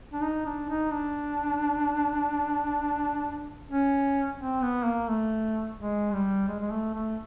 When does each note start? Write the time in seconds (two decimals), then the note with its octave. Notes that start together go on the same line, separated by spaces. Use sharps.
0.13 D4
0.22 D#4
0.46 D4
0.69 D#4
0.92 D4
3.70 C#4
4.40 C4
4.63 B3
4.85 A#3
5.08 A3
5.79 G#3
6.13 G3
6.47 G#3
6.59 G#3
6.70 A3
6.95 A3